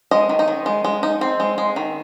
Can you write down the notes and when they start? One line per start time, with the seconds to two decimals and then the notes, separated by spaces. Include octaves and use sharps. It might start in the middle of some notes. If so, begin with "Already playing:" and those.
0.11 G#3 D#5
0.29 D#3
0.39 D#4
0.48 D#3
0.66 G#3
0.84 G#3
1.03 D#4
1.21 C4
1.40 G#3
1.58 G#3
1.76 D#3